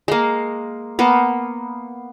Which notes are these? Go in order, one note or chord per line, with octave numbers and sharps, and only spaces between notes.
G#3 A#3
A#3 B3